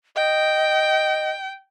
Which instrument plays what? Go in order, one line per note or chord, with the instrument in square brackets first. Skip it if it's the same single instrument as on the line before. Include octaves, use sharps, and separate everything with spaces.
[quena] D#5 [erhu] G5